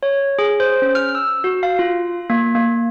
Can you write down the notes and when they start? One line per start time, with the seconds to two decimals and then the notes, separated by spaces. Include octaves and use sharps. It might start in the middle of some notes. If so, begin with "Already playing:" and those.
0.03 C#5
0.39 G#4
0.60 C5
0.82 C#4
0.95 F6
1.15 E6
1.44 F#4
1.63 F5
1.79 F4
2.30 A#3
2.55 A#3